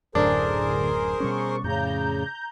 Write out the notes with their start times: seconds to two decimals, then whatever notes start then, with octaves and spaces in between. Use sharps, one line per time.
0.15 D1 F#2 A2 D3 D4 G#4 A#4 C5
1.20 B2 G3 C#4 C#6
1.64 F2 A2 C#3 A#5 G6